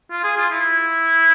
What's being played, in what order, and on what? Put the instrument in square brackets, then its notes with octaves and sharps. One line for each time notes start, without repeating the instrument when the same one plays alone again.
[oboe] F4
G#4
F4
E4